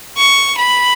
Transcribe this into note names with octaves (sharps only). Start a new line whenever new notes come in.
C#6
B5